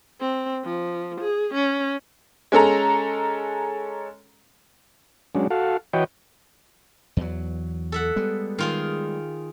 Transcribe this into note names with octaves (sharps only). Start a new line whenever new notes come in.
C4
F3
G#4
C#4
G#3 C#4 A4 A#5
F#3 G#3 C#4 D4
F#4 A4 F5
E3 F#4 B4 C#5 D#5 G5
E2 F#3
A4 E5 F#5
G3 G#3 B3
D#3 F4 G#4